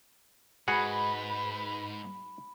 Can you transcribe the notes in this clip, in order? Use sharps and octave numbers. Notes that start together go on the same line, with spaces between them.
G#2 F#4 G#4 B4 F#5 B5